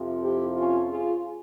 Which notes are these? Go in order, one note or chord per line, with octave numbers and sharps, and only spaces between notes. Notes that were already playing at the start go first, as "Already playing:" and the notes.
Already playing: F2 C3 F3
E4 G4
C#4 F4
F4 G#4